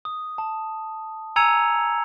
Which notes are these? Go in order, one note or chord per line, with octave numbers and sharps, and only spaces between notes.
D#6
A5
G#5 A#5 E6 G#6 C#7 F7